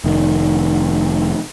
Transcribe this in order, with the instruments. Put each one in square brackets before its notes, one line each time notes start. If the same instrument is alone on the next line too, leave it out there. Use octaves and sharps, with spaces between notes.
[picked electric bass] F1 D#3